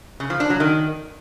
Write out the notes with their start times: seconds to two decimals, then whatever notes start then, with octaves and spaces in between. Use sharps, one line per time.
0.20 C#3
0.30 F3
0.40 D4
0.50 F#3
0.60 D#3